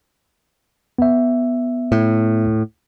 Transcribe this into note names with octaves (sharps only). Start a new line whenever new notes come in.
B3 E5
A2